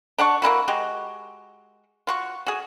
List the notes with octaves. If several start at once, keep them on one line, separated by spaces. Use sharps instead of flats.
D4 F#5 A5 C#6
A#3 C#4 E4 F#4
G#3 F#4 G4
F4 F#4 C#6
F#4 G#4